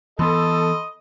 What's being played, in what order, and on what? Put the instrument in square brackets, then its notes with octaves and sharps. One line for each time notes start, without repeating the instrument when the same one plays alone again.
[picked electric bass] E3 B3 [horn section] A4 [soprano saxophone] D#5 [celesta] B5 C6